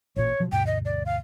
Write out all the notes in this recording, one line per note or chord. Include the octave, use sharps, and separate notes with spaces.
A1 A#2 C#5
B2 F3 F#3
D2 G2 B2 G5
D#5
D5
F5